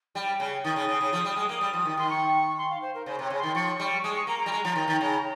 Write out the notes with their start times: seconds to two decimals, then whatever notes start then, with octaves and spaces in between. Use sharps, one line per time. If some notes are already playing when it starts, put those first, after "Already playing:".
0.15 G3 G5
0.40 C#3
0.64 D#3 D#6
0.76 C#3
0.89 C#3
1.01 C#3
1.13 F3
1.25 G3
1.36 G#3
1.49 A#3
1.61 G3
1.73 F3
1.85 D#3
1.97 D#3 C6
2.10 C#6
2.58 C6
2.70 F5
2.82 C5
2.95 A#4
3.06 C#3 C5
3.19 C3
3.23 C#5
3.30 C#3
3.39 D#3 C6
3.55 F3 C#6
3.80 G3
4.04 G#3 D#6
4.15 C#6
4.27 A#3 A#5
4.39 A#5
4.46 G3
4.52 G#3
4.65 F3
4.76 D#3
4.88 D#3
5.01 C#3